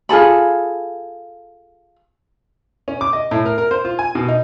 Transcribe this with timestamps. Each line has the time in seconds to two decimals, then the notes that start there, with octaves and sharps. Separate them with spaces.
0.09 F4 G#4 A4 B5
2.88 C#4
3.01 D6
3.13 D#5
3.31 A2
3.46 A#4
3.58 A#4
3.71 C5
3.85 F4
3.99 G#5
4.15 B2
4.29 D#4